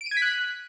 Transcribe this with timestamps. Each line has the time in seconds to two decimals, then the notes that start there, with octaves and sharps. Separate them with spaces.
0.01 D7
0.06 D#7
0.11 G#6
0.17 B6
0.22 F#6